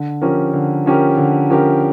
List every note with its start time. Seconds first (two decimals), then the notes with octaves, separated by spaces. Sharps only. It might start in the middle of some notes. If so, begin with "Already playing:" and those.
Already playing: D3
0.21 F3 C#4 G4 A#4
0.53 D3
0.86 F3 C#4 G4 A#4
1.17 D3
1.50 F3 C#4 G4 A#4